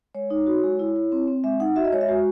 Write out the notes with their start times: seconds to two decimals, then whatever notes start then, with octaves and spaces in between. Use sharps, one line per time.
0.15 G#3 C#5
0.30 D#4
0.46 F#4
0.64 G#3
0.79 E4
0.96 E4
1.12 C4
1.28 C4
1.44 G#3 E5
1.60 D#4 F#5
1.76 F#4 E5
1.85 D#5
1.92 G#3 C#5
2.01 E5
2.08 G#3 F#4